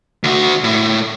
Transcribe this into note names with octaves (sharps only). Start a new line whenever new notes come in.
D2 F#4
A2